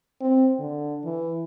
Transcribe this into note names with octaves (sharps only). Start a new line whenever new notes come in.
C4
D3
E3